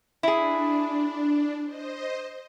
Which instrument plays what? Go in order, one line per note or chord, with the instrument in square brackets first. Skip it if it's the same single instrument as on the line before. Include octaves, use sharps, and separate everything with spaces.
[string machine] D4 [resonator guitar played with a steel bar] E4 G#4
[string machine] C5 D#5